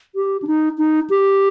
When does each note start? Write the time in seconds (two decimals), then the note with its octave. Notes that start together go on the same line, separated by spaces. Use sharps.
0.15 G4
0.42 D4
0.47 D#4
0.78 D#4
1.10 G4